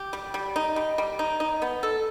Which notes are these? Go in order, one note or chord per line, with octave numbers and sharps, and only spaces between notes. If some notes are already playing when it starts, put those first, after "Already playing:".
Already playing: G4
G3
G3
D#4
G3
G3
D#4
D#4
B3
A4